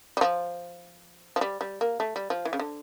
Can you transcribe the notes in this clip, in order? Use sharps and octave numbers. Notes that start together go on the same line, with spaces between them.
G3
F3
F3
G3
G3
A#3
A3
G3
F3
E3
C#3
D3